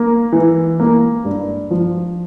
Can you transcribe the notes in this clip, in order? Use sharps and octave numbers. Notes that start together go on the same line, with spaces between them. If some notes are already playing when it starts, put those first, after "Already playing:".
Already playing: A#3
E3
A#3
G2
F3